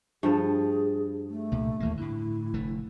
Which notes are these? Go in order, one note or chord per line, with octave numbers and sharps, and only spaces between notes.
G2 F3 G#4 A4
A3
C2 A#2
D#2 E3 A#3
A2 D3 E4
F1 D3 A3